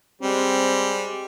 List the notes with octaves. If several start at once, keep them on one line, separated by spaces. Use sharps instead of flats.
G3 G#3 C4